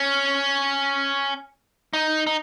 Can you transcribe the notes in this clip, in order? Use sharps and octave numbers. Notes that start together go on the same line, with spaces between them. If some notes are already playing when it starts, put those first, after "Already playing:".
Already playing: C#4
D#4
D#4